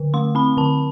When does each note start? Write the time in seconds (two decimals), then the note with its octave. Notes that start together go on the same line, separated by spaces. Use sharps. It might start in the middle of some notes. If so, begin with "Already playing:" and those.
Already playing: D3
0.14 A3 C6
0.35 C4 B5
0.57 D3 A5